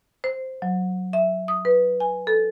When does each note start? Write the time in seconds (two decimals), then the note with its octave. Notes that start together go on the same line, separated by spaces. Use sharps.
0.24 C5
0.62 F#3
1.13 E5
1.48 D#6
1.65 B4
2.00 G#5
2.27 A4